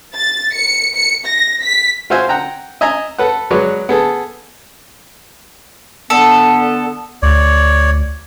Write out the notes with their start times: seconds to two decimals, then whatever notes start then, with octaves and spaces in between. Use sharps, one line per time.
0.14 A6
0.53 C#7
0.95 C#7
1.26 A#6
1.61 B6
2.10 F4 F#4 C5 E5 G#5
2.29 F#5 G5 A#5
2.81 D#5 E5 G#5 A#5
3.19 A4 B4 F#5
3.51 F#3 G#3 B4 C#5 D5
3.89 B3 G#4 A4
6.10 D3 B3 A4
7.22 D2 C#5 D5